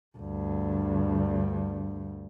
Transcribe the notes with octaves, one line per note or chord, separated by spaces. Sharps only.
D2 G2